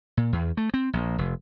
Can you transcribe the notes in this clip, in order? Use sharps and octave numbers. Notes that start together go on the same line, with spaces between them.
A#2
E2
A3
C4
A#1
F1